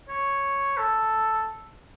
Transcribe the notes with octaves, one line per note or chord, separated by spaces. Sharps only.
C#5
A4